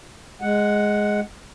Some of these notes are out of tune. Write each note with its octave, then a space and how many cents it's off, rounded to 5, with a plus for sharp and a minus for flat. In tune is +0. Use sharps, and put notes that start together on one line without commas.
G#3 +0 F#5 +0